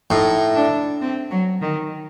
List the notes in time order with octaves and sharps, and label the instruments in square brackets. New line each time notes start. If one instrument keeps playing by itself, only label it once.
[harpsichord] A2 [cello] D#4
[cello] D4
C4
F#3
D#3